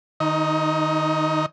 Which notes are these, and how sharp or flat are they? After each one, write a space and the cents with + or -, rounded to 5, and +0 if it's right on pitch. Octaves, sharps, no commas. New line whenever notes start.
D#3 -20 D#4 +20